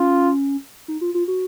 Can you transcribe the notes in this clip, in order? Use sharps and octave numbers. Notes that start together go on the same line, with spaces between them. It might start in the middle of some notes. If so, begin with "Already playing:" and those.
Already playing: C#4 F4
D#4
F4
F4
F#4